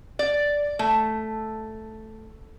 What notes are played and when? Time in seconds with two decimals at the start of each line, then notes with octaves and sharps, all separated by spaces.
0.19 D5
0.79 A3